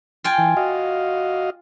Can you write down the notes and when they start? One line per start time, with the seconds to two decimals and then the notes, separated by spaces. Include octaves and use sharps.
0.24 F4 G5 G#5
0.38 E3
0.57 F#4 D#5 F5